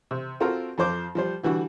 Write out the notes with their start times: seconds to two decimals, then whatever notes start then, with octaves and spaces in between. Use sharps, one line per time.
0.11 C3
0.40 C4 F4 F#4 A4 A#4
0.78 F2 F3 C5 D6
1.15 F3 G3 C5
1.43 D3 E3 G3 F#4